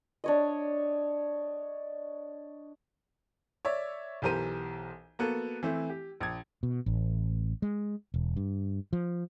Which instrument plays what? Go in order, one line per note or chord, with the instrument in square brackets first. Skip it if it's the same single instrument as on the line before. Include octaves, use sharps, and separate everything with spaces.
[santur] D4 C#5 D#5
[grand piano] C#5 D5 E5
B1 E3 G4 A#4 C5 D#7
A#3 B3 F#4 A4
E3 A3 C4 E4
G4
A#1 G#6
[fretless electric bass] B2
A1
G#3
E1
G2
F3